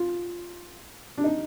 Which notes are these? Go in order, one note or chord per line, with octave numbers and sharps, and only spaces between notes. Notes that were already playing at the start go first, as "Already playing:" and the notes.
Already playing: F4
D4
D#4